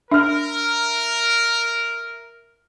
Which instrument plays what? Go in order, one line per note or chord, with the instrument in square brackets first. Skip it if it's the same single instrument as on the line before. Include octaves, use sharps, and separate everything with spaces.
[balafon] D4 [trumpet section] A#4 [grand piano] E5 F6